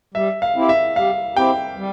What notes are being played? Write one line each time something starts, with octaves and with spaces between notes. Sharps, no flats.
G3 E5
F5
C4 E4 G4
E5
G3 F5
C4 E4 G4 G5
G3